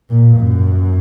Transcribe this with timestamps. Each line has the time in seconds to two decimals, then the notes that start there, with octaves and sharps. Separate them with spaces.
0.10 A#2
0.40 F#2